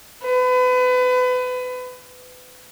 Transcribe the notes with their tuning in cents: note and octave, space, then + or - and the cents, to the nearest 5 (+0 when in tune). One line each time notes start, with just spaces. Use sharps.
B4 +30